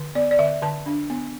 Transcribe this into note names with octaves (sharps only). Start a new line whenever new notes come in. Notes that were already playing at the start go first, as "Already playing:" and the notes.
Already playing: D3
B3 D5
D5
D3 E5
D3 A5
D4
B3